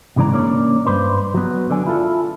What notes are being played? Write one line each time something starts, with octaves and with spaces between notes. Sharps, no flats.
C2 G#2 C#3 E3 D5 A#5
A#3 C#4 D4 C#5 D5
G2 C3 B4 C5 D5
F#3 B3
D3 D5 G#5
E4 F4 A4